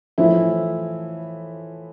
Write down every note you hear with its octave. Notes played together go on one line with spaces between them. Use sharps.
A2 E3 F3 A3 E4